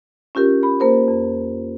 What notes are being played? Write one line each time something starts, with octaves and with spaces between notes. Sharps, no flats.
C#4 F4 G4 A#4
B5
A#3 A#4 C5
F2